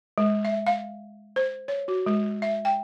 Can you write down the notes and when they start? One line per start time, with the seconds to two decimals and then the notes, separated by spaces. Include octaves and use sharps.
0.18 G#3
0.45 E5
0.67 F5
1.36 C5
1.68 C#5
1.88 F#4
2.06 G#3
2.42 E5
2.65 G5